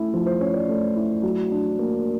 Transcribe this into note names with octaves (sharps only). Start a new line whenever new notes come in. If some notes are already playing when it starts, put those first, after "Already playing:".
Already playing: A3 C#4 E4
F3
C5
C#4 C#5
D5
A3
E4
F#3
D4
A#3